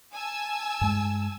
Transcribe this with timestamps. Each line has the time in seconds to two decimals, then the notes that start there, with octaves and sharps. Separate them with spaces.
0.13 G#5 A5 E6
0.81 G2 G#3